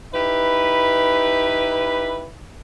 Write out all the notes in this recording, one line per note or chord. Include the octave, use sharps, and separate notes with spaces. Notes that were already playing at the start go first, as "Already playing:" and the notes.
D#4 E4 G4 B4